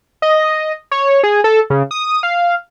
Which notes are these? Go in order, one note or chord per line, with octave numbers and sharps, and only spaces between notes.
D#5
C#5
G#4
A4
C#3
D#6
F5